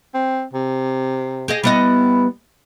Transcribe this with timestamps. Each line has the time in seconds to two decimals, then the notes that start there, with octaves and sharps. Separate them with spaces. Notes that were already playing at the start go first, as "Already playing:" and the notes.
0.14 C4
0.53 C3
1.48 G4 G#4 D#5
1.64 G3 B3 E4 D#5